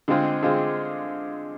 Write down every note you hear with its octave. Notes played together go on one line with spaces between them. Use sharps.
D3 G#3 C4 F4 G#4
D3 G#3 C4 F4 G#4